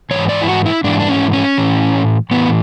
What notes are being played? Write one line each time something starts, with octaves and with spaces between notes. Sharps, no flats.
G#2 E3 C#5
D5
E4
F#4
E4
G#2 E3 D4
D4
C#4
C#4
A2 E3
A2 E3 B3